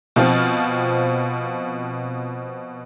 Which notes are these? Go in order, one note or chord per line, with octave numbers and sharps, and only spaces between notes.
B2 F3 C4 F4